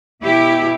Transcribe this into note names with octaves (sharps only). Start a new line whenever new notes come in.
B2 E4 G4